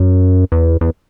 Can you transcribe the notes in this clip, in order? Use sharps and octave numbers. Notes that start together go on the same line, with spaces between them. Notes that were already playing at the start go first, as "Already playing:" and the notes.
Already playing: F#2
E2
E2